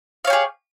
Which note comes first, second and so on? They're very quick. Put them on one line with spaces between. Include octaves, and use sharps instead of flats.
F5 C#5 G4 G#4